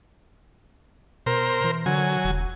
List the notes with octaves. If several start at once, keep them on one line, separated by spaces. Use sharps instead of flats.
B2 A#4 C5
E3
D3 F#3 G#5
E1